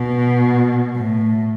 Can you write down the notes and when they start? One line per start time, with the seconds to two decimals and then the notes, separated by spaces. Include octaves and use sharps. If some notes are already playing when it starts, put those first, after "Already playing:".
Already playing: B2
0.96 A2